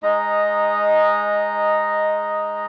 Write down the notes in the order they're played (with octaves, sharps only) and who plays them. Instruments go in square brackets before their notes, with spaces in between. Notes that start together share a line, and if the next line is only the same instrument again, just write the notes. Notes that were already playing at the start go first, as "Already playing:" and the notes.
[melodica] G#3 D#4 D#5 A#5